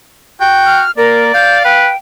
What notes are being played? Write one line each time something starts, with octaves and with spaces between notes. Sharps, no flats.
F#4 G5
F6
A#3 A#4 D5
F5 G6
B4 G5